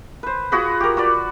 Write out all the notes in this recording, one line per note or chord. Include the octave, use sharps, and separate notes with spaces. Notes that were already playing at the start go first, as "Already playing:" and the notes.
B4 C5
F4 F#4 G#4 B4
G4 A#4
F#4 B4 D5